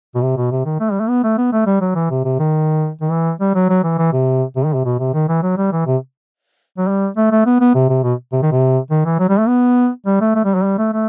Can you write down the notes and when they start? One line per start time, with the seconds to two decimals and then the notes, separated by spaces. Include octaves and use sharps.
0.15 B2
0.22 C3
0.37 B2
0.51 C3
0.66 D#3
0.80 A3
0.91 G3
1.00 A3
1.09 B3
1.24 A3
1.38 B3
1.53 A3
1.66 G3
1.81 F#3
1.95 E3
2.10 C3
2.25 C3
2.39 D#3
3.01 D#3
3.11 E3
3.40 G3
3.55 F#3
3.69 F#3
3.84 E3
3.98 E3
4.13 C3
4.56 C3
4.65 D#3
4.74 C3
4.85 B2
4.99 C3
5.14 D#3
5.28 E3
5.43 F#3
5.58 G3
5.72 E3
5.86 C3
6.78 F#3
6.88 G3
7.17 A3
7.31 A3
7.46 B3
7.60 B3
7.75 C3
7.89 C3
8.03 B2
8.33 C3
8.42 D#3
8.52 C3
8.91 D#3
9.05 E3
9.19 F#3
9.29 G3
9.39 A3
9.48 B3
10.06 G3
10.21 A3
10.35 A3
10.45 G3
10.55 F#3
10.64 G3
10.78 A3
10.93 A3